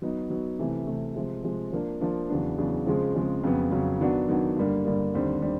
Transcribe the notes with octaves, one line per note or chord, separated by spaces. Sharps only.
F#3 B3 D#4
F#3 B3 D#4
C3 E3 A3
C3 E3 A3
C3 F3 G#3
C3 F3 G#3
F3 A#3 D4
F3 A#3 D4
E2 C#3 F#3 B3 D4
E2 C#3 F#3 B3 D4
C#3 F3 G#3 C4
C#3 F3 G#3 C4
F2 C#3 F#3 B3
F2 C#3 F#3 B3
D#3 F#3 B3 D4 F#4
D#3 F#3 B3 D4 F#4
G2 D3 G3 A#3
G2 D3 G3 A#3
D#2 D3 G3 C4
D3 G3 C4